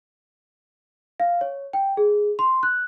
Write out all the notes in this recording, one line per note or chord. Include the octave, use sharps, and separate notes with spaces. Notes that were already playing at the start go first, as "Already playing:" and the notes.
F5
C#5
G5
G#4
C6
F#6